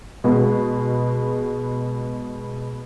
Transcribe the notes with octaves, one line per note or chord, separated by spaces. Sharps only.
B2 G#3 B3